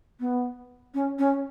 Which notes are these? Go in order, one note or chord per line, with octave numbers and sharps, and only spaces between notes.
B3
C#4
C#4